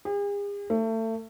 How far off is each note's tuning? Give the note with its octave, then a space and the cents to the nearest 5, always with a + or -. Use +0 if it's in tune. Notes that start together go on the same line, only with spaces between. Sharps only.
G#4 -45
A3 +30